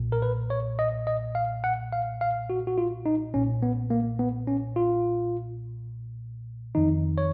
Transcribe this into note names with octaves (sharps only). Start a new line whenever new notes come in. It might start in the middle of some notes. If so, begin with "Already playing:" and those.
Already playing: B1 A#2
A#4
B4
C#5
D#5
D#5
F5
F#5
F5
F5
F#4
F#4
F4
D#4
B1 A#2 C#4
B3
A#3
B3
C#4
F4
F2 D#3 D#4
C#5